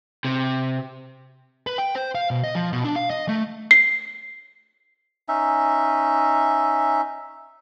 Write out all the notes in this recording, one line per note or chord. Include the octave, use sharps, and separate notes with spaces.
C3
B4
G5
C5
F5
B2
D#5
F3
B2
D4
F5
D#5
A3
C7
C#4 D#4 E5